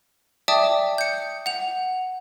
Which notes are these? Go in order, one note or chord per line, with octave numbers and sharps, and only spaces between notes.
D5 E5 G5 A5 D6 D#6
G6 C#7
F#5 F7